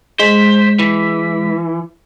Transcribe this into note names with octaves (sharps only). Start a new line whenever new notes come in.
G#3 C5 B6
E3